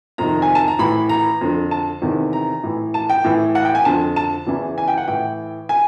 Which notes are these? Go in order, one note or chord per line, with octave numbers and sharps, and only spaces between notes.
F2 C3 D#3 A#5
G#5
A5
A#5
A2 E3 B5
A#5
F2 D3
A5
E2 C3 D#3
A#5
A2 E3
A5
G5
A2 E3
F#5
G5
G#5
F2 D3 A5
A5
E2 C#3 E3
G#5
G5
F#5
A2 E3 G5
G#5